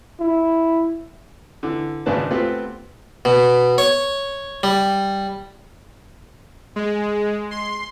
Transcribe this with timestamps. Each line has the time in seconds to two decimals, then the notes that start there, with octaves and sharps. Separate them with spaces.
0.20 E4
1.63 D3 E3
2.06 G#1 C#3 G#3 D4 B4 A5
2.31 A3 B3 C4 F4 G4 B4
3.25 B2
3.78 C#5
4.63 G3
6.76 G#3
7.51 C6